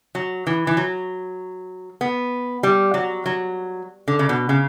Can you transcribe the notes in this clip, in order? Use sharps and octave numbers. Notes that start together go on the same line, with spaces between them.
F#3
E3
E3
F#3
B3
G3
F#3
F#3
D3
C#3
B2
C#3